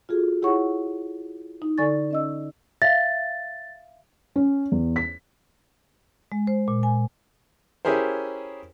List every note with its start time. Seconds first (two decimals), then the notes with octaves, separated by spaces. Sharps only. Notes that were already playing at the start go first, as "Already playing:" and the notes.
0.09 F4 F#4 G#4 A4
0.42 E4 G4 G#4 C#5 F#5 C#6
1.62 D#4
1.78 D3 A4 D5 G#5 C#6 A6
2.11 C#4 D#5 E6
2.82 E5 F5 A6
4.36 C#4
4.72 E2
4.96 B6
6.32 G#3
6.47 C5
6.68 A#2
6.83 G#5
7.85 C#4 E4 G4 G#4 A#4 C5